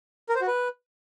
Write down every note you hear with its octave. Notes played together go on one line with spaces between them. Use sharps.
A#4
C5
F#4
B4